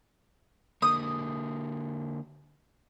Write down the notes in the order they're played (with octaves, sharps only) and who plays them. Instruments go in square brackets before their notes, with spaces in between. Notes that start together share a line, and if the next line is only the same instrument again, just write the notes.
[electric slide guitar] D3 A#3 [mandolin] D#6